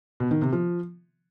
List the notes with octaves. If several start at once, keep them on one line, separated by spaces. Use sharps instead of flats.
B2
D#3
C3
F3